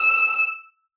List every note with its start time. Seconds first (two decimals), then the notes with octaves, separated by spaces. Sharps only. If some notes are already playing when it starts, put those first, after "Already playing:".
Already playing: E6